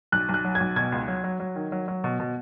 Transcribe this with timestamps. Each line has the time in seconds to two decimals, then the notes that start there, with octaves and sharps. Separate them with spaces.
0.12 B1 F#6
0.29 B1
0.34 F#6
0.45 F#3
0.55 G#6
0.60 B1
0.76 B2 G#6
0.92 C#2
1.08 F#3
1.24 F#3
1.40 F#3
1.56 D#3
1.72 F#3
1.88 F#3
2.04 B2
2.20 B2